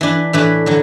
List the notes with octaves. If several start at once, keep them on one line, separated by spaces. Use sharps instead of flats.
E3 D4 B4
A2 E3 D4 B4
D3 F#3